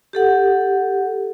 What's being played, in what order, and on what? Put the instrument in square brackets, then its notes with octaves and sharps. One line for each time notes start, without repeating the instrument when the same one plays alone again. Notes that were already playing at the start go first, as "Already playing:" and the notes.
[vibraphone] G4 A4 F#5